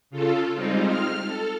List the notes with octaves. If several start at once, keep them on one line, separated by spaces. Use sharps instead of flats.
C#3 F4 A4
G3 G#3 C4 D#4 F4
F6
A4